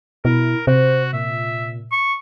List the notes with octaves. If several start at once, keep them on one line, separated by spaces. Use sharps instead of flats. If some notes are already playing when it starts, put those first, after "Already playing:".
B2 E4 A#4
C3 F#4 C5
A#2 E5
C#6